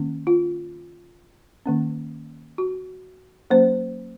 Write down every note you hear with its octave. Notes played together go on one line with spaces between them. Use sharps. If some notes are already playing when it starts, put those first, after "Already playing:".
Already playing: D#3 A#3 C#4
F4
D#3 A#3 C#4
F#4
F#3 A#3 C#4 C5